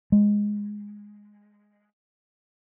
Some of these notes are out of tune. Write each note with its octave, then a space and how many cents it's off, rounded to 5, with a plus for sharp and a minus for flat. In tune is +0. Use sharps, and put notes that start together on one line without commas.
G#3 -5